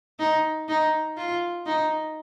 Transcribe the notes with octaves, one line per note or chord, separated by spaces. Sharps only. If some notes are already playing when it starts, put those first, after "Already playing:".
D#4
D#4
F4
D#4